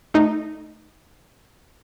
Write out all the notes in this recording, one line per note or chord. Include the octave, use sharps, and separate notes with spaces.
A3 D#4